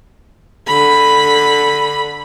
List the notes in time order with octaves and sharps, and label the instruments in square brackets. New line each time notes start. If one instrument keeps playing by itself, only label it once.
[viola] D3 B5